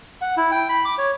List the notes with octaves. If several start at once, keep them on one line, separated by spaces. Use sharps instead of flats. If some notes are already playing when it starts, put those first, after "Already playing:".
F#5
E4
G5
B5
D6
C#5